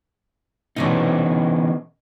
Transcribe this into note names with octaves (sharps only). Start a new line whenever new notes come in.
B2 E3 A3 C4 C#4 D#4